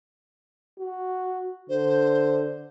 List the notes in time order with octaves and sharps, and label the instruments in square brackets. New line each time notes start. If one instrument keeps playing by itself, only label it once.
[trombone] F#4
[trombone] D3 [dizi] C5